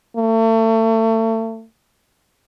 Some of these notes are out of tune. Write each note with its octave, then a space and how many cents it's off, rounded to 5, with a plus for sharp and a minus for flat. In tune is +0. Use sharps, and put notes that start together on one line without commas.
A3 +35